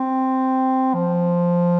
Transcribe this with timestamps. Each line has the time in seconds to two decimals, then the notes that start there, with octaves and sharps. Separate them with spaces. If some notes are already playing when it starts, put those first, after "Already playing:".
Already playing: C4
0.94 F3